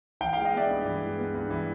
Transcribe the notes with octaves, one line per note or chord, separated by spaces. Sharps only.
E3 F5 G5
F5 G5
G#3
D#5 F5
B3 D5 E5
G2
E3
G#3
B3
G2
E3